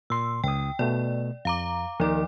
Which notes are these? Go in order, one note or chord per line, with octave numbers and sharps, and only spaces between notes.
A#2 C6 E6
C#2 G5 D#6
B2 A3 D5
F2 F5 A#5 D6
D#2 D#3 F3 D5 D6